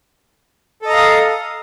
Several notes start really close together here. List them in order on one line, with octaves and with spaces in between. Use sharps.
A4 D#5 A#5 F5 D#6